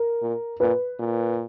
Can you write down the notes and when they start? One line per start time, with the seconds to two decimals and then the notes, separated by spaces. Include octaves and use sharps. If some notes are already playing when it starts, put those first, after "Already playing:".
Already playing: A#4
0.22 A#2
0.60 A#2 B4
0.99 A#2